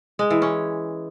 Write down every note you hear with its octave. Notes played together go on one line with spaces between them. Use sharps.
G#3
E3
C#4